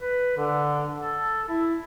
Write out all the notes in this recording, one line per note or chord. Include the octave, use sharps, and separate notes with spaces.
B4
D3
A4
E4